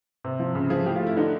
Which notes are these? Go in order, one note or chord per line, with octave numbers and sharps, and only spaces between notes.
C3
F3
C#3
F3 G#4
A2 G4
F4
A3 E4
D3 D#4